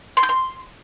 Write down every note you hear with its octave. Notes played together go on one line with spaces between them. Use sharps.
C6
G6
C6